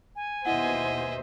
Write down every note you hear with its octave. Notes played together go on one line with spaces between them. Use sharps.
G#5
D#2 B2 E4 C5 D#5 E5 F#5